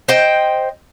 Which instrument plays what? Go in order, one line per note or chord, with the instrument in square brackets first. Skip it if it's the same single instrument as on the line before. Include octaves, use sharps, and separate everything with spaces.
[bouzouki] C5 D#5 G5